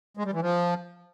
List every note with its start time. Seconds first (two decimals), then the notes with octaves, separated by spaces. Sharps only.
0.17 G#3
0.25 G3
0.33 E3
0.41 F3